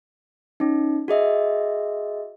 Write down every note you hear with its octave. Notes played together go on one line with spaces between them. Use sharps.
C#4 D#4
F#4 G#4 D#5 E5